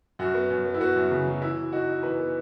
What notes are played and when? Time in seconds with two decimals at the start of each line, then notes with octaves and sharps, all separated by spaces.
0.19 F#2 F#4
0.34 B3
0.50 F#2
0.65 B3
0.74 E4
0.80 B3 F#4
0.96 F#2
1.11 C#3
1.27 F#3
1.42 E3 E4
1.57 E3
1.72 D#4 F#4
1.88 D#4
2.03 E3 B4
2.19 B3